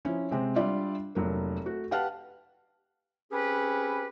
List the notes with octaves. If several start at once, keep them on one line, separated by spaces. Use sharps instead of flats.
F3 C#4 E4
C3 G#3 C4
G3 D4 F4 D5 E5
F1 F#3 A#3
A3 F#4
G4 B4 F5 F#5 A5 F6
C4 C#4 G4 G#4 B4